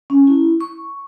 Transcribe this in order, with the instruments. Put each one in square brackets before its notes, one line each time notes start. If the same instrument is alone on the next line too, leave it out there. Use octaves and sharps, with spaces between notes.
[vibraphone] C#4
E4
C#6